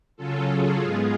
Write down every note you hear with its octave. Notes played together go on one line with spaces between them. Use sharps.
C#3 F#3 C#4 F4 A4
G#4
G#2 G#3 B3 F4